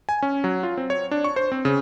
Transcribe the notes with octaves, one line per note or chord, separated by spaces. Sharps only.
G#5
C#4
F#3
F4
C4
C#5
D4
C#6
C5
C4
C#3